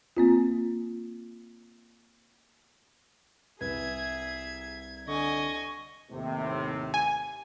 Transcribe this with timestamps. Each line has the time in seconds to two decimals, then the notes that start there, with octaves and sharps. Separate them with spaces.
0.17 A#3 C4 F4
3.61 C2 G#4 B4 E5 G#6
5.08 D3 D#5 G#5 C#6
6.11 D#2 A2 C3
6.94 G#5